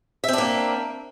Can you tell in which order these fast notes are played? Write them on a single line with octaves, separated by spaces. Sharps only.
E5 C4 D4 A#3